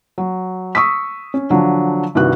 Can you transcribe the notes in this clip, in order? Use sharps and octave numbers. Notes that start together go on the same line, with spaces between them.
F#3
C#6 D#6 E6 B6
C#4
D3 F3 F#3 D4
C2 G2 D#3 F#4 F#6